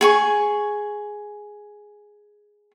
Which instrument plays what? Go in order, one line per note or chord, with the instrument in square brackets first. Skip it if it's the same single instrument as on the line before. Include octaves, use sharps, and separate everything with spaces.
[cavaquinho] G#4 G#5 C#6